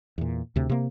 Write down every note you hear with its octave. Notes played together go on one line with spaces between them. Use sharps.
E2 A#2
D2 C3
C3 A#3